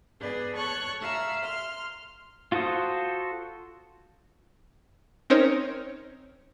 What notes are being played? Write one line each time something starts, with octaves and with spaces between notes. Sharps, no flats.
B3 G#4 B4 D5
A4 C#5 C#6 F#6
E5 F5 A#5 E6
C6 F6
F4 F#4 A4 C5 D#6
C4 C#4 D#4 A#4 C5 C#5